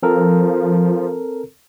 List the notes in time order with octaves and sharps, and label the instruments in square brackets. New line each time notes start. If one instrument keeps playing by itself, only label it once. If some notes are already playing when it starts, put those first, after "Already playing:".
[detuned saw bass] F3 [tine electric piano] C4 A4 A#4